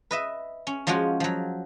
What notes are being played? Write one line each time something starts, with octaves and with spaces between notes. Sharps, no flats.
B4 D#5 E5
C#4
F3 G#3 C#4 F4 F#4
F3 F#3